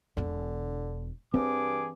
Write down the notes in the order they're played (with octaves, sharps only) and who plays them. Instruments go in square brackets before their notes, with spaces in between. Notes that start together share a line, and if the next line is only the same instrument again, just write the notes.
[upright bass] E1 B2 [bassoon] D3
[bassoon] G2 [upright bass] E3 [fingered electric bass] C4 [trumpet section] G#4 D6